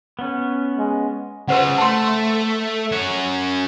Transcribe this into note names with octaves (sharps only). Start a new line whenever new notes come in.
B3 C#4
G#3
C#3 F4 B4 C5 F#5
A3 A5 C6
C#4 F#4